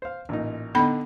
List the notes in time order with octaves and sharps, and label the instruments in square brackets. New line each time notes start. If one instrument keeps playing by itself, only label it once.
[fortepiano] C5 F5
A1 A#2 D#4
[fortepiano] D3 D#4 [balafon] B3 B5